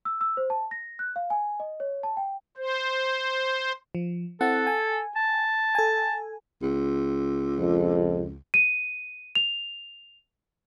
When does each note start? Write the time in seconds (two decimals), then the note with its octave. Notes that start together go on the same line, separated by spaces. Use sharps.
0.05 E6
0.21 E6
0.37 C5
0.50 A5
0.71 A#6
0.99 F#6
1.16 F5
1.30 G#5
1.60 D#5
1.80 C#5
2.03 A5
2.17 G5
2.57 C5
3.95 F3
4.41 C4 E4 A4 F#5
4.67 G#5
5.16 A5
5.75 A4 G#5
6.62 C#2
7.59 F2
8.54 D#7
9.35 F7